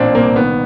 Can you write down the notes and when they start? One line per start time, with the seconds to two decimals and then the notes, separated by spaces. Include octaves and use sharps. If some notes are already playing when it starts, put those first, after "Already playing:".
Already playing: A1 A#2 C4 D4
0.15 C2 A#3 C4
0.36 D#3 B3